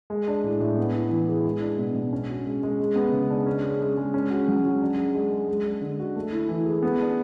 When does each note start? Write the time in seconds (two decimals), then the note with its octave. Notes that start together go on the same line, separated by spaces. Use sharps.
0.10 G#3
0.28 D4
0.44 A2
0.60 A2
0.78 B3
0.94 E4
1.11 E3
1.29 G#4
1.45 G#3
1.61 D4
1.79 B2
1.95 B2
2.13 C#4
2.30 F#4
2.46 G#3
2.63 G#3
2.80 G#3
2.96 B3
3.13 C#3
3.30 D4
3.46 C#4
3.64 G#4
3.81 G#3
3.97 G#3
4.14 C#4
4.30 F#4
4.48 F#3
4.64 F#3
4.81 D4
4.98 G#4
5.15 G#3
5.32 G#3
5.48 G#3
5.66 D4
5.81 D3
5.99 F#4
6.16 A3
6.33 E4
6.49 E3
6.66 G#4
6.83 B3
7.00 D4